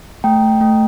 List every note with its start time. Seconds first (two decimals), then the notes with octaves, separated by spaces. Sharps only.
0.24 A3 G5
0.61 A3